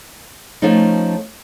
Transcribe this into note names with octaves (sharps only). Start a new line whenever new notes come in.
F3 A3 C#4 D#4